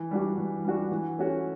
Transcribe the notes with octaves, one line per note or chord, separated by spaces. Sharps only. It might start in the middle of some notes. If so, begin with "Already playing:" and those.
Already playing: E3
G3 D4 F#4
E3
G3 D4 F#4
E3
A3 C#4 F#4 C#5